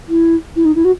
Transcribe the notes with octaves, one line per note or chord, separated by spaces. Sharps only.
E4
E4
D#4
E4
F#4